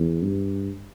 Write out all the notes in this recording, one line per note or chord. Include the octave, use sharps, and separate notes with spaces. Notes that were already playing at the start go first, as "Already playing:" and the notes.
Already playing: E2
G2